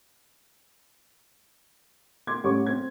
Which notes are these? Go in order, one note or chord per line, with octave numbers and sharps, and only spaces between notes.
C6 D6 G#6
A1 G3 A3 C#5 C#6 D6
C4 G#6